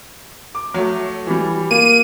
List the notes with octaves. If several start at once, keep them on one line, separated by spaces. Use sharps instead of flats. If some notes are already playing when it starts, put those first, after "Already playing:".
D6
F#3 A3
E3 G3
A#3 D#7